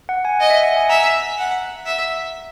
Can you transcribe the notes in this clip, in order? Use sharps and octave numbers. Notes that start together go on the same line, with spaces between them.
F#5
G#5
D#5
E5
F#5
G#5
E5 A#5
F#5
E5